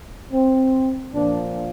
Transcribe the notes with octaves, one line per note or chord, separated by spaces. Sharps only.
C4
A#2 F3 D4